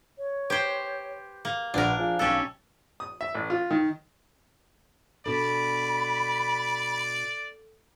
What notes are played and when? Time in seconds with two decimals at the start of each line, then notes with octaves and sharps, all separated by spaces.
0.18 C#5
0.50 G4 B4 C5 G6 G#6
1.45 A#3
1.74 A#1 D4 A#4 B4 F#5 D6
1.98 F3 G#4 F5
2.19 B1 C#4 G4 A4
3.00 D#6
3.21 E5
3.35 A1
3.50 F4
3.70 D#3
5.26 B2 D4 A4 D5 B5